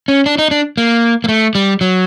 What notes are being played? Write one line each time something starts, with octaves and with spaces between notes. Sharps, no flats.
C#4
D4
D#4
D4
A#3
A#3
A3
G3
F#3